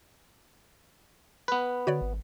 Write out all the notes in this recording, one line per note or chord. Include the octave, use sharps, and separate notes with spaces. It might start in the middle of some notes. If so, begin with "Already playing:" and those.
B3 B4
D3 F#4 C#5 D5
G#1